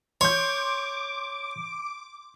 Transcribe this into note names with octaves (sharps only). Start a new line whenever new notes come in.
C#5 C6 D6 G6